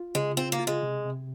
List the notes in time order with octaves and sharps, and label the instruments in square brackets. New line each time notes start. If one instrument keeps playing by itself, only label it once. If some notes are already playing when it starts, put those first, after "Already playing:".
Already playing: [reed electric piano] F4
[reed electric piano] C#3 [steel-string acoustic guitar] G#3
[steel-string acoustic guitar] C4 [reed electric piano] F4
[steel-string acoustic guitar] A#3
[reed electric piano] F4
[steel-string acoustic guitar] G#3
[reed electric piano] C3
C3